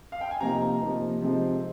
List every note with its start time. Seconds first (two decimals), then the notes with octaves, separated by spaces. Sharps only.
0.12 F5
0.21 G5
0.31 G#5
0.41 C3 F3 A#3 D#4 A#5
0.80 C3 F3 A#3 D#4
1.21 C3 F3 G#3 C4 D#4